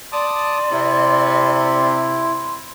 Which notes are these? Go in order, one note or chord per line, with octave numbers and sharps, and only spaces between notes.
D5 A5 C6 D6 D#6
C3 E4